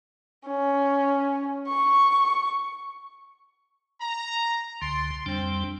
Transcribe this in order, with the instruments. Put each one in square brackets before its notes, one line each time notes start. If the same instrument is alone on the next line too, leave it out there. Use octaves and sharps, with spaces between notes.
[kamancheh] C#4
C#6
[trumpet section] A#5
[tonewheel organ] C#2 D3 [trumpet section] C6
[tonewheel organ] F2 G3 D4 [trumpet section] C4